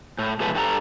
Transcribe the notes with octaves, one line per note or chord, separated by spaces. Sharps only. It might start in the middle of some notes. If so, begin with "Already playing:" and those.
A2
B2 F3 G#3 A3 B4
G2 G3 A4 A#5